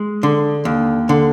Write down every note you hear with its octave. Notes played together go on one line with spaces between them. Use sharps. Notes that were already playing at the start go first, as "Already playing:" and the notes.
Already playing: G#3
D3
D#2
D3